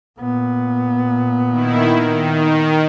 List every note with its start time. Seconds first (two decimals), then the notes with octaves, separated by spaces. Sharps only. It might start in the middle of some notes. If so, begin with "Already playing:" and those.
0.20 A#2 B3
1.50 D#3 E4
2.00 D#3